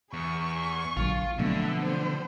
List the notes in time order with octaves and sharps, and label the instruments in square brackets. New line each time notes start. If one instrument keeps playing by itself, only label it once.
[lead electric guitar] E2 [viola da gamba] G#4 [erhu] C#6
[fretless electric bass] A#1 D3 F#3 [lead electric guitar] F4
[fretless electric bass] B2 F#3 A3 [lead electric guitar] D3 [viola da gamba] F3 B3 C4 [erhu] E5
[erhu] C5